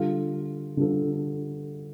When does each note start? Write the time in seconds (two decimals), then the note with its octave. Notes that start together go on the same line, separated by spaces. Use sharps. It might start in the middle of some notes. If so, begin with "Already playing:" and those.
Already playing: D3 G3 F4 A4
0.77 D3 G3 F4 A4